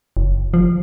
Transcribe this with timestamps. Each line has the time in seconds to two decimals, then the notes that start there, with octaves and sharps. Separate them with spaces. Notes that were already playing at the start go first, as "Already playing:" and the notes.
0.17 F#1
0.54 F3